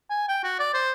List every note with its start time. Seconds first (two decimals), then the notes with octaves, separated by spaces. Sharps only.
0.10 G#5
0.28 G5
0.44 F#4
0.59 D5
0.74 C5